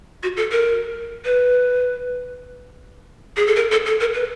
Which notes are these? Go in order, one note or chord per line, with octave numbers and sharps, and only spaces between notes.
F#4
A4
A#4
B4
G#4
A4
A#4
A4
A4
A#4
B4